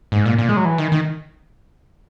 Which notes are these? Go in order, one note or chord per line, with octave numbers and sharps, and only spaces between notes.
G#2
A#2
A#2
G#3
F#3
E3
D#3
D#3